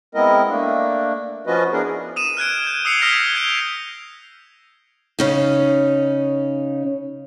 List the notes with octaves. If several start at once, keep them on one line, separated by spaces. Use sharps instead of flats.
G#3 B3 C4 E4 A#4 D#5
A3 A#3 D4
F3 C#4 F4 F#4 B4 D#5
B3 D4 E4 G#4 A#4
D#6 D#7 E7
F6 F#6 G#6 D7
G6 G#6
D#6 E6 C7 C#7 F7 G7
D#6 F6 G#6 A#6 B6 D#7
G6 G#6 D7 F7
C#3 C#4 D#4